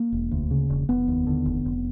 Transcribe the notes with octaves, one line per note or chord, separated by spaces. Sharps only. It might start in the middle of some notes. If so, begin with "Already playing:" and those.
Already playing: A#3
E1
D2
C#3
E1
F1 B3
D#2
D3
F1
F1